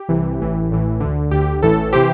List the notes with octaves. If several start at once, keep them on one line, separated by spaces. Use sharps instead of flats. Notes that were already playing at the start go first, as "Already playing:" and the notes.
Already playing: G4
C2 C3 E3
A1 A2 E3
A1 A2 E3
D2 D3
D2 D3 G4
A1 A2 E3 A4
C3 E3 G4 C5